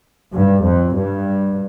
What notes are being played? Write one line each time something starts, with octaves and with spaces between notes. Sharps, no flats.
G2
F2
G2